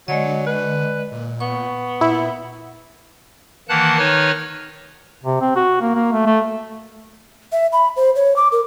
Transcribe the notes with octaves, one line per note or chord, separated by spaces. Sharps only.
D3 F#3 G#3 D5 D#5
B4
A#2
B3 C#6
A#2 E4
D#3 E3 A#3 F#5 A5 F#6
D#3 D#4 B4 C#5 F6
C3
C4
F#4
A#3
A#3
A3
A3
E5
B5
C5
C#5
D6
A#4